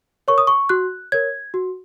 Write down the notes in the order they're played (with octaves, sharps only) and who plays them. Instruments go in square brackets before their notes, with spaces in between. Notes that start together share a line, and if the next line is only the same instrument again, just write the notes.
[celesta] A#4 C#5 C#6
D#6
C#6
F#4 F#6
A#4 C#5 G#6
F#4